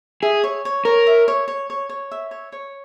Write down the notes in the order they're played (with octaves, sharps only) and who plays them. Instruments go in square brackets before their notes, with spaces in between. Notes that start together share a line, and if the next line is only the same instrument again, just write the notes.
[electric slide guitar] G#4 [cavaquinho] E5
[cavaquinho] C#5
C#5
[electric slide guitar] A#4 [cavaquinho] C#5
[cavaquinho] E5
C#5
C#5
C#5
C#5
E5
C#5
C#5